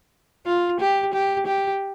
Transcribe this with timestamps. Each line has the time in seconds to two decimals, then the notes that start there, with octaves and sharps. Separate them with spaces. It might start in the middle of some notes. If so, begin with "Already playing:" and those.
0.46 F4
0.80 G4
1.14 G4
1.47 G4